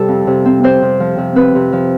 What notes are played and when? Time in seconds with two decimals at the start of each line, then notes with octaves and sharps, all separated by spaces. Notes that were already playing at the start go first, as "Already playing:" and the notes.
Already playing: C3 G3 G4 A4
0.08 F2
0.27 C3
0.45 C4
0.63 C4 C5
0.82 C3
1.00 F3
1.18 C3
1.35 C4 B4
1.55 C3
1.72 F3